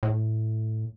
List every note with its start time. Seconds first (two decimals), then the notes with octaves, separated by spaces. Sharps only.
0.03 A2